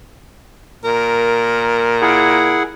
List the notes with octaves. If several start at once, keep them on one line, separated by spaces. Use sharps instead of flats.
A#2 A#4
E4 G#4 F#5